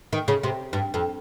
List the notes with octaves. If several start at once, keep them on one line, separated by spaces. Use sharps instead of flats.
D#3
C#3
C3
G2
F2